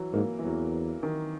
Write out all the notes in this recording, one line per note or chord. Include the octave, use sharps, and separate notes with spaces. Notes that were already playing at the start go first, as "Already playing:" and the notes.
Already playing: E3 F#3
G#2 A#3
E3
E2 F#3
D#3